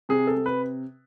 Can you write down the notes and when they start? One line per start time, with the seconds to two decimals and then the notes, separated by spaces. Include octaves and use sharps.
0.09 C3 G#4
0.27 A4
0.36 C3
0.46 B4